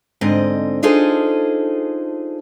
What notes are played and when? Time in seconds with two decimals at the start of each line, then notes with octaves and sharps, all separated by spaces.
0.21 G#2 D3 C4 D#5
0.83 D4 D#4 F4 G#4 A4 C5